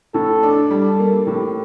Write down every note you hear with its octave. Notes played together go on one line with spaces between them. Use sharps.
A2 A4
D4
G3 A4
A#3
A2 G4